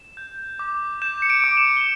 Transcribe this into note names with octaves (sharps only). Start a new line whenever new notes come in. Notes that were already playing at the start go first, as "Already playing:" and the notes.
Already playing: E7
G6
D6
G6 E7
C#7
D7
D6
E7
G7